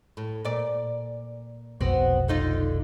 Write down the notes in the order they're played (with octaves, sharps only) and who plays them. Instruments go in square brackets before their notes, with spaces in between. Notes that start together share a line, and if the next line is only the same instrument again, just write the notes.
[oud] A2
A#2 D5
[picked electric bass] F1 B1 [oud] B3 C4 F#4
[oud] D3 D#4 F4